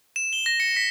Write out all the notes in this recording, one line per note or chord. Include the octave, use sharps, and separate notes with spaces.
E7
G7
A#6
C#7
B6